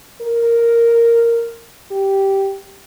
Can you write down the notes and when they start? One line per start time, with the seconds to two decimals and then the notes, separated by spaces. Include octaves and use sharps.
0.22 A#4
1.91 G4